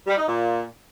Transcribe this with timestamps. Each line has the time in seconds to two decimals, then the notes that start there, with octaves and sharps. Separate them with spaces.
0.07 G3
0.18 D#4
0.29 A#2